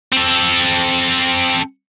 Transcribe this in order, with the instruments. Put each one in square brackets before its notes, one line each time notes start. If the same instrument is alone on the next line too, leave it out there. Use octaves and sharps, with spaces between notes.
[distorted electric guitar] C4 A4